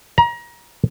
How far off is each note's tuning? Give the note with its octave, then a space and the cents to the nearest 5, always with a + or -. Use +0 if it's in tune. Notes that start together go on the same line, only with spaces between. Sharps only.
A#5 +30